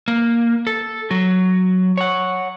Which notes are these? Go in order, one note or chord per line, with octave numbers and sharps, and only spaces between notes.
A#3
A4
F#3 F#4
C#5 F#5